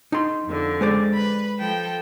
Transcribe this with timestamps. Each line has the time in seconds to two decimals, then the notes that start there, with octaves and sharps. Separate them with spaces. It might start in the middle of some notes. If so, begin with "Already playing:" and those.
0.12 D#4 C6
0.47 F2 D3
0.81 G#3 C5 D5
1.14 B4 B5
1.60 F3 A4 G5